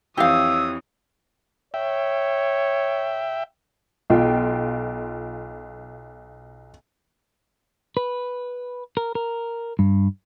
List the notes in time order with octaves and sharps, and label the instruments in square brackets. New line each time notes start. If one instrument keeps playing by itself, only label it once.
[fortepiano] F2 E3 [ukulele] G4 F5 [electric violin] C#5 D#6 [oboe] E6
[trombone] C#5 [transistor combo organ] E5 G5
[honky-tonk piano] B1 F4 G5
[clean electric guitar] B4
A#4
A#4
G2